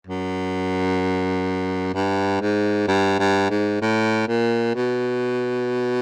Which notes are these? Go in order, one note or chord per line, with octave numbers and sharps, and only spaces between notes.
F#2
G2
G#2
G2
G2
G#2
A2
A#2
B2